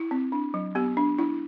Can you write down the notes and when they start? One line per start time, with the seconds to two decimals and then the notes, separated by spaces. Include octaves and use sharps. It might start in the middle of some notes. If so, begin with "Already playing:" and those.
Already playing: E4
0.11 C4
0.32 D4
0.54 F#3
0.75 B3 G4
0.97 D4
1.18 D4 E4